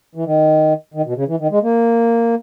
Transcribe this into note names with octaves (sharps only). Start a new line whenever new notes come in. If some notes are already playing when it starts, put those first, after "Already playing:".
E3
D#3
D#3
B2
C#3
E3
D#3
G#3
A#3